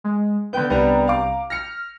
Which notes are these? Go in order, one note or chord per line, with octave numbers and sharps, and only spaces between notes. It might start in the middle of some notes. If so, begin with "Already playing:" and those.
G#3
D3 B3 G5 G6
C2 G3 B3 D4 A#5
F5 D6
F6 A#6 C#7